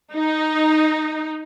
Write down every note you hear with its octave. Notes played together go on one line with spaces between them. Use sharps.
D#4